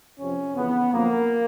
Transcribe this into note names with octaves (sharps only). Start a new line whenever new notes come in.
F2 C3 F3 C#4
F2 C#3 E3 B3
F#2 D3 F3 A#3